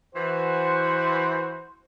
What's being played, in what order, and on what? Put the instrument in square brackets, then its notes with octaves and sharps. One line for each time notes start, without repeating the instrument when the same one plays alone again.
[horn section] E3 F#4 [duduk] C5